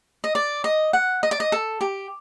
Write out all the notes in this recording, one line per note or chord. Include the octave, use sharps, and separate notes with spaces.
D#5
D5
D#5
F#5
D#5
D5
D#5
A4
G4